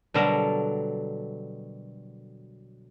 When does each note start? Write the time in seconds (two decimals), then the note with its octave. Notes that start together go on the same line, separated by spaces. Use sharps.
0.14 B2 D3 F#3 G3 A4 A#4